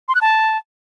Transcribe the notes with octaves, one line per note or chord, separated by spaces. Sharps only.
C6
F#6
A5